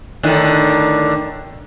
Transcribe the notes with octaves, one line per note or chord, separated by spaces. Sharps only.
A2 D3 D#3